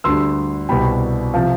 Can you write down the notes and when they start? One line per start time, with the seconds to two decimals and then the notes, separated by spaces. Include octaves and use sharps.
0.04 D2 D3 G3 C6 E6
0.69 C2 B2 G3 G5 B5
1.34 C3 F3 F5 A5